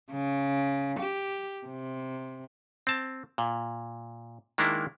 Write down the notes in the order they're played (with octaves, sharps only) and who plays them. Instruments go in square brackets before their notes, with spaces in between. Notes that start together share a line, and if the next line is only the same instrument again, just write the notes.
[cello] C#3
G4
C3
[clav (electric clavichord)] C4 A5
A#2
D#3 G#3 A#3 D4 E4